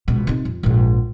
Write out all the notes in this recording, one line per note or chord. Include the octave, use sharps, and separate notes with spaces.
C#2 B2
C3 D#4
F2
A#1 G#2